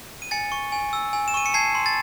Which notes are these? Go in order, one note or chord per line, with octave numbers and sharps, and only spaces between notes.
D#7
G#5 A6 C#7
C#6
G#5
E6
G#5
E7
C#6 D#7
C#7
A5 G#6 C7
C6
A6